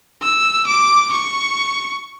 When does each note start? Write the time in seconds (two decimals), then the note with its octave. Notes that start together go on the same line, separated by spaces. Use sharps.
0.21 E6
0.67 D6
1.12 C#6